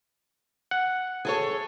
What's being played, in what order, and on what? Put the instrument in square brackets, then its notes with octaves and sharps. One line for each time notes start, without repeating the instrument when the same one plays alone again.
[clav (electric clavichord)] F#5
[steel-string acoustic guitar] G#4 A4 C#5